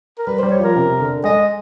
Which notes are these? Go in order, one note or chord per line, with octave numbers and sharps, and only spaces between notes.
A#4
G3 B4
C5
G3
C#5
F3 A#4
C3
D3
G#3 D#5